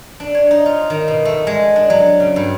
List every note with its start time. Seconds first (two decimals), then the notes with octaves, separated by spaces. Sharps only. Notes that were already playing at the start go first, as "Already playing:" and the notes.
0.20 D4
0.35 C#5
0.51 D#4
0.66 F4
0.90 D#3
1.08 B2
1.25 A3
1.47 G#3
1.76 D4
1.90 F#3
2.20 C#3
2.36 G2